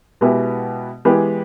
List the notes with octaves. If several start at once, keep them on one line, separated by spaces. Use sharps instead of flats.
B2 G#3 B3 E4 G4
E3 G#3 B3 G4